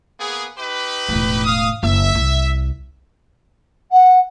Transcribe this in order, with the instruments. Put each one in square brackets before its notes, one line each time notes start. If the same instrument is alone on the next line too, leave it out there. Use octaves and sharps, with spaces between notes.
[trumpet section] A#3 B3 G#4
D#4 G4 B4
[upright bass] E1 A2
[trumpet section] F5 D#6
[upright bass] F#1 A#3 [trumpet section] E5
[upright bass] C2
[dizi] F#5